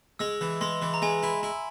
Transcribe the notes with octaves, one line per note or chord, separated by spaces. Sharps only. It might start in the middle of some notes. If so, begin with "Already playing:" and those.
G#3 E6
E3
G#3 C6
E3
A#5
G#3 G#5
E4
E4